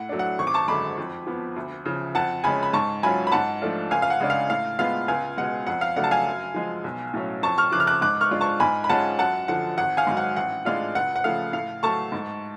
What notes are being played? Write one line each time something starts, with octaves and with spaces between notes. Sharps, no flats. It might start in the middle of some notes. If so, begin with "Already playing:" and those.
Already playing: A2 F#5
F#3 A3 D4
F#5
G#1 C#6
D6
A5 C#6
F#2 D3 G#3 B5 D6
F2
F3 B3
D2
C#3 F3
F2 F#5 A5
C#3 G#3 C#4 G#5 B5
B5
G#2 A5 C#6
F#3 C#4 F4 G#5 B5
B5
G#2 F#5 A5
F3 A3 D4 F4
C#2 F5 G#5
F5
F#5
C#3 G#3 D4
F5
A2 F5
G#3 B3 F4 F5
C#2 F5 G#5
B2 G#3 F#5
F2 F#5
F5
C#3 F#3 A3 D4 F#5
A5
F5 G#5
F#2
F3 G#3
B1
A2 F#3 C#4
F2 A5 C#6
C#6 F6
C#3 F3 D6 F#6
F6
D6 F#6
G#2 D6 F#6
C#6 F6
G#3 D4 F4
A5 C#6
G#2 G#5 B5
B5
G#3 C#4 F4 F#5 A5
F#2 F#5 A5
D3 F3 F#5
G#1 F#5
F5 G#5
G#2 F#3
F#5
A1 F#5
A2 G#3 D4 F4 F5
C#2 F#5
F#5
C#3 F3 A3 F5
A2 F5
F#3 A3 A5 C#6
G#2